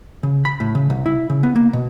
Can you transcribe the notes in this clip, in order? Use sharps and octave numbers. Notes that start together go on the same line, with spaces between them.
C#3
B5
A2
C#3
C2
E4
C#3
B3
A#3
B2